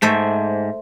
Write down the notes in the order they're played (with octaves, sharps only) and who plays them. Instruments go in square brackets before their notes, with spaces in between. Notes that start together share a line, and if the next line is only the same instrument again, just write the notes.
[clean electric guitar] G#2 [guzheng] A3 C5 E5